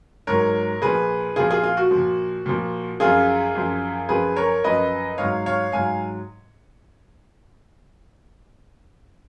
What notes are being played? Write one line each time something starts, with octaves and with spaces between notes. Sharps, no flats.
G#2 F#3 A#4 C#5
A#2 F3 G#4 B4
A#2 F3 F4 G#4
F4 G#4
F4
F#4
F3
A#2
A#2 F3
F#2 F3 F4 G#4
F#2 F3
F#2 F3 G#4 B4
A#4 C#5
F#2 F3 B4 D#5
G#2 F#3 C#5 F5
C#5 F5
G#2 F#3 F5 G#5